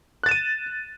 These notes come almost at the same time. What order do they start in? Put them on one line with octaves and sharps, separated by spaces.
F#6 A6 E7 D#7